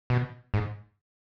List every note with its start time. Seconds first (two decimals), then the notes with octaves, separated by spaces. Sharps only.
0.10 B2
0.54 G#2